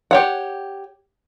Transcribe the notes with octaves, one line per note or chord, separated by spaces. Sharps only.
G4 C#5 F#5